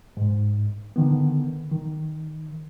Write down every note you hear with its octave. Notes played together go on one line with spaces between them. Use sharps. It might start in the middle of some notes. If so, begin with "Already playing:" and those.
G#2
D3 D#3 B3
D#3